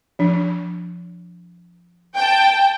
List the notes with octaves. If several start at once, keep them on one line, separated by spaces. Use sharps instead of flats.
F3 D4
G5 A5